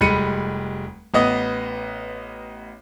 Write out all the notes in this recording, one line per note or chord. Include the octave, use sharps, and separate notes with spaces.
F1 G3 G#3 B5 C#7 D#7
A1 B3 D#5 D#6